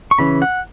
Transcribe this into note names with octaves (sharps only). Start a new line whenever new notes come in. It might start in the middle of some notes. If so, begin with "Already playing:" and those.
C#6
C#3 E3 C#4 B5
F#5